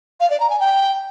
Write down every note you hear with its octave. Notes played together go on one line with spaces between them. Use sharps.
F5
D5
A#5
G#5
G5